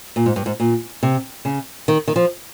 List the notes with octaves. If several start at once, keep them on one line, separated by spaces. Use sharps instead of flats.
A#2
G#2
G2
G#2
A#2
C3
C#3
D#3
D#3
F3